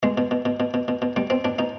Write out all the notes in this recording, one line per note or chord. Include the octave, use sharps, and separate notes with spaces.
B2 G#3
B2
B2
B2
B2
B2
B2
B2
B2 G3
B2 C4
B2 D4
B2 D#4